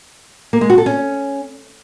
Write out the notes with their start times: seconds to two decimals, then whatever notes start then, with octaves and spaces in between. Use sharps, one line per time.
0.53 A#3
0.61 G#3
0.70 F#4
0.78 A4
0.86 C#4